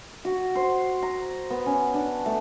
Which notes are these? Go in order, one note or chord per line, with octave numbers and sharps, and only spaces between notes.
F#4
C5
A#5
B3
C#4
D4
A3